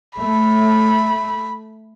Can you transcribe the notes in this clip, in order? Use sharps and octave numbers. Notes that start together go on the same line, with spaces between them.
A3 B5